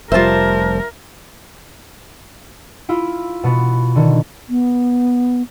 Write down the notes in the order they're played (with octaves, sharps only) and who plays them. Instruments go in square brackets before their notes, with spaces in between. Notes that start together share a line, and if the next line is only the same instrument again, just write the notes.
[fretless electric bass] F1 G3 [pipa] F4 E5 [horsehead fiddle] A#4 [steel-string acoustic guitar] C5 A5
[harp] E4 F4
B2 B3
D3 D#3
[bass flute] B3